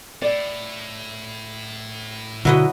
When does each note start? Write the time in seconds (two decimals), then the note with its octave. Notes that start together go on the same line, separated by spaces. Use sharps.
0.22 A2 D5
2.45 B2 D3 F#3 E4 F#4 B4 D#5